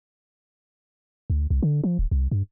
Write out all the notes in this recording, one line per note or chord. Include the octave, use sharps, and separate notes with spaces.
D2
C2
D3
F3
D1
C2
G2